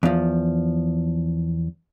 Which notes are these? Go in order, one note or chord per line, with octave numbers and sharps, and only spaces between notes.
E2 F3